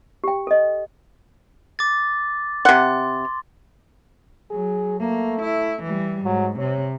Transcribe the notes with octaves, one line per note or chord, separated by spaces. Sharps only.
G4 G5
A4 D#5
D6 A6
C3 F#5 C6
F#3 G#4
A3 A#3
E4
E3 G3
G#2 F#3
C3 C#5